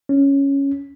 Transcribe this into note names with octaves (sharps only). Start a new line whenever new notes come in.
C#4